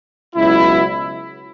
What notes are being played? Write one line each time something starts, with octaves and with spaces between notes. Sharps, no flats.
C#2 B2 F#3 E4